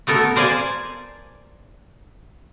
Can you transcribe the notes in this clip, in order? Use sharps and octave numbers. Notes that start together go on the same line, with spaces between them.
A3 B3 A4 A#4
A#4 C5 D5 F5 G#5